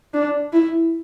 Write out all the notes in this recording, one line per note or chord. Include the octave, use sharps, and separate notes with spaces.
D4
E4